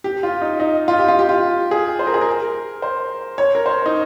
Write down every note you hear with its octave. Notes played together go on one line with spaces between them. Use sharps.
G4
F4
D#4
D#4
F4
G4
F4
G4
F4
G#4
C5
A#4
G#4
A#4
C5
C#5
A#4
C5
D#4